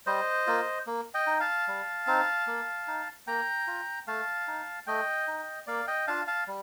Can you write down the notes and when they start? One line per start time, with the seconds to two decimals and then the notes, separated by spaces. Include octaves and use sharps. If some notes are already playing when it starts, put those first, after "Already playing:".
0.06 G3 C5 D#5
0.47 A#3 F4
0.87 A#3
1.14 D#5 G5
1.27 D#4
1.40 F5 A5
1.68 G3
2.07 C4 D#4
2.47 A#3
2.88 D#4
3.27 A#3 G5 A#5
3.67 F4
4.07 A3 F5 A5
4.47 D#4
4.87 A3 D#5 G5
5.28 D#4
5.67 A#3 D5 F5
5.87 D#5 G5
6.07 D4 F4 F5 A5
6.27 F5 A5
6.47 G3